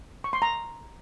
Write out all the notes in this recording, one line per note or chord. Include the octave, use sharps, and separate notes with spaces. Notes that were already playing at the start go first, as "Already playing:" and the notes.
C#6
C6
A#5